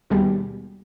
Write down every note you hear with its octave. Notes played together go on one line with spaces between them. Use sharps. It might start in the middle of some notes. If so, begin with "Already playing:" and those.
D#2 B2 G3 G#3